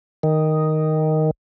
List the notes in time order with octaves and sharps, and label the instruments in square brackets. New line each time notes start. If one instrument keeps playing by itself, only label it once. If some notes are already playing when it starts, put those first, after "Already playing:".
[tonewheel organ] D#3